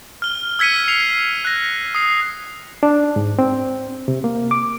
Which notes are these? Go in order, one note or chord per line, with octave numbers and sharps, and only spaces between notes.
F6 G7
E6 G#6 B6 C#7 D#7
C7 F7
F#6 A#6
D#6 C7
D4
G#2
C4
C3
A#3
D6